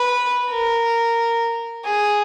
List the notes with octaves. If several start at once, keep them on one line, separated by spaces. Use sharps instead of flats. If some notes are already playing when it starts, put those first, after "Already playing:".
Already playing: B4
A#4
G#4